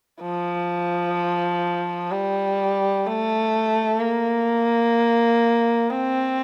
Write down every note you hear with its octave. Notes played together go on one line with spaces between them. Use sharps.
F3
G3
A3
A#3
C4